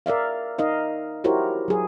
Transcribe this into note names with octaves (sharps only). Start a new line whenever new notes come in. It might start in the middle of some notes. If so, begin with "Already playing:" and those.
A#4 D5 E5 F5
D#4 A#4 D#5 F5
E4 F#4 G4 A#4 C5 C#5
F#3 G#4